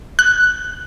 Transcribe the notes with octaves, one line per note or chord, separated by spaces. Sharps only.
F#6